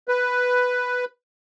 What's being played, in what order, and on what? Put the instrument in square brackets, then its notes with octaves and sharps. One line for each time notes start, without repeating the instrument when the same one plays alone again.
[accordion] B4